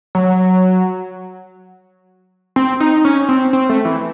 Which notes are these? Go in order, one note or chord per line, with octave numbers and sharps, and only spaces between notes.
F#3
C4
D#4
C#4
C4
C4
A3
E3